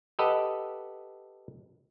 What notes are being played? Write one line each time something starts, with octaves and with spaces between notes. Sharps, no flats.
G4 A4 B4 D#5 F#5